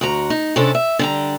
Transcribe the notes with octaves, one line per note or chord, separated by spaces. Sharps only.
D2 F#4 A#5
D#4
C3 G#3 C#4 D4 E4 A4
E5
D3 G3 A#5